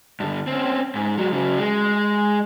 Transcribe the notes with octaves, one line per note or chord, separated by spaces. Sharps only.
G2 D3
C4 C#4
G#2
F#3 G#3
C#3 F#3
G#3